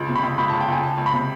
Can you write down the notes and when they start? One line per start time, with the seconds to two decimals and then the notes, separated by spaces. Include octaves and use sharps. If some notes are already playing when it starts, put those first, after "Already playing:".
Already playing: C#2
0.09 C3
0.16 B5
0.23 C#2
0.38 C#2 B5
0.50 A5
0.53 C#2
0.61 G5
0.68 C#2 G#5
0.83 C#2 A5
0.98 C#2
1.06 B5
1.13 C3